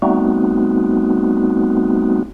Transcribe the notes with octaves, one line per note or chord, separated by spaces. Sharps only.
G3 A3 B3 C4 D#4 F#4